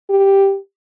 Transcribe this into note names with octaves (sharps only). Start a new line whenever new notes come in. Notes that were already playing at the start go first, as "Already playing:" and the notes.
G4